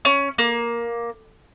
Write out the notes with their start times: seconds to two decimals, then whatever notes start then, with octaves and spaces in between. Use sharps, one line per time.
0.05 C#4
0.38 A#3